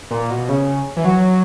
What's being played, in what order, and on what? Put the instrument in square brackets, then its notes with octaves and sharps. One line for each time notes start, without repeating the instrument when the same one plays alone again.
[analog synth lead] A#2
B2
C#3
E3
F#3